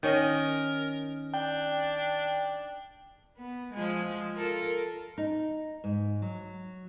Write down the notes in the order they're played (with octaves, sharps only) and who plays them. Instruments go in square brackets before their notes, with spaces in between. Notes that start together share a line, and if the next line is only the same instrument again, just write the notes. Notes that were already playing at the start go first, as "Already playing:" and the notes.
[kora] D#3 C#4 D#5 [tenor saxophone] A#4
[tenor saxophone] D4 [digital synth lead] G5
[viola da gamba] B3
F3 G#3
F4 A4 A#4
[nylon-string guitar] D#4
G#2
F#3